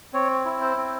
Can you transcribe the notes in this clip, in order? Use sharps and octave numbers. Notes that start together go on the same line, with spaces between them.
C4 C#5
E4
C5
C4